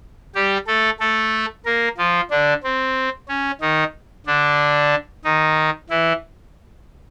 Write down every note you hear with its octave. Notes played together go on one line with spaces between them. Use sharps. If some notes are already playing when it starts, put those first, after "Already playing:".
G3 G4
A3 A4
A3 A4
A#3 A#4
F3 F4
D3 D4
C4
C#4
D#3 D#4
D3 D4
D#3 D#4
E3 E4